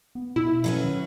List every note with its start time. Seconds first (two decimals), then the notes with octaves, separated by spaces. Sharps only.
0.15 B3
0.36 B2 E4
0.64 F#3 C#4 B4
0.84 D#3